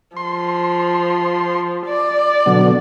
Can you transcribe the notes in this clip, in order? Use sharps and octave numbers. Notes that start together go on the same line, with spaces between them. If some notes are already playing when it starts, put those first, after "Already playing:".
F3 C6
D5
B2 D3 F#3